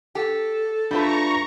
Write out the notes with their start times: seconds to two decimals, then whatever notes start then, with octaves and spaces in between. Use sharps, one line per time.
0.15 G4 A4
0.91 G3 A3 D4 F4 B4 A#5 C#6 A#6